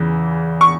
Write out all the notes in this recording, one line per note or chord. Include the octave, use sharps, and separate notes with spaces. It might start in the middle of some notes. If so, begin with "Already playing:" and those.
Already playing: E2 C#3 E3
C#6